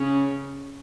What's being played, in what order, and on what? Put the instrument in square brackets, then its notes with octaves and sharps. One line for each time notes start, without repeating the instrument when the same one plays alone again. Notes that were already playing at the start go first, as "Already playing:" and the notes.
Already playing: [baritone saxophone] C#3 [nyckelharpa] C#4